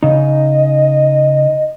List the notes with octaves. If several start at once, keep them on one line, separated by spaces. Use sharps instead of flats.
C#3 D#4 D#5